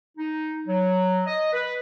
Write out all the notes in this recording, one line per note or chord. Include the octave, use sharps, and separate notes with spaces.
D#4
F#3
D#5
B4